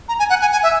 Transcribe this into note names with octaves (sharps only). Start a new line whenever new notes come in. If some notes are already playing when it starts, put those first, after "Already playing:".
A#5
G#5
F#5
G#5
G#5
E5